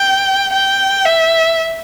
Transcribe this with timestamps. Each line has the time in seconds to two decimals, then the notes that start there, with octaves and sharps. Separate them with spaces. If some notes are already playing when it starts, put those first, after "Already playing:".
Already playing: G5
0.53 G5
1.05 E5